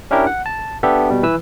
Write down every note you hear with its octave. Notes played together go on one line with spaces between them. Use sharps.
C#4 D4 E4 G4 A#4
F#5
A5
B3 D4 G4 A4 E5
B2 G3
E3 B4 E6